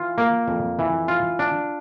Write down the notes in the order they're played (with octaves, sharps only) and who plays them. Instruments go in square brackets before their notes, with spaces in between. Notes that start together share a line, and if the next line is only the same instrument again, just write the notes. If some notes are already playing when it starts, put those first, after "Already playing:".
Already playing: [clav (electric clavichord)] E3 F4
A#3
F2
E3
F4
D4